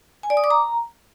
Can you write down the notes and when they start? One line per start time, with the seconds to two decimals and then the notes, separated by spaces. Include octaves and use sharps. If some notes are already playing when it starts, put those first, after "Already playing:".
0.23 G#5
0.30 D5
0.37 D#6
0.44 D6
0.50 A#5